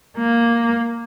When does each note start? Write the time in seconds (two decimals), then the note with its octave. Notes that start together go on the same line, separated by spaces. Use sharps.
0.17 A#3